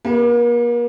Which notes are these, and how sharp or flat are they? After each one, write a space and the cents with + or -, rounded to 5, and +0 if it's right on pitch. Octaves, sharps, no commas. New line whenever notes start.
A#3 +40 G4 +0 B4 -10